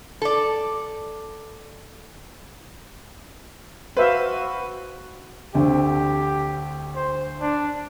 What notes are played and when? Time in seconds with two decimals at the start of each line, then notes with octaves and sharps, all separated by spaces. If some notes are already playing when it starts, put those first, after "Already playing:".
0.22 A4 D5
3.97 F#4 B4 C5 E5 F5
5.55 D2 D3 C4 G4
6.96 C5
7.41 D4